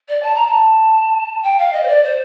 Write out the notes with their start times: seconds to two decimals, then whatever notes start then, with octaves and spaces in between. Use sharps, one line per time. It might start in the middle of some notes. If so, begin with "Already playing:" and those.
0.08 D5
0.22 A5
0.34 A#5
0.46 A5
1.43 G5
1.58 F5
1.72 D#5
1.82 C5
1.87 D5
2.03 C5